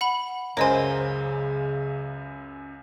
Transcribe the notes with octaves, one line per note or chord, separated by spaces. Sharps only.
F#5 B5 F#7
C#2 F#2 C#3 A#4 C5 C#5 D#5 G#5